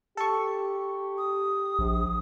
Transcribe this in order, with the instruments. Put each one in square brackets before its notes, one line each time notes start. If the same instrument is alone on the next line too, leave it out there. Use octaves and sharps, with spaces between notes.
[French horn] G4 [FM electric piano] A4 C#6
[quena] D#6
[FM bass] A#1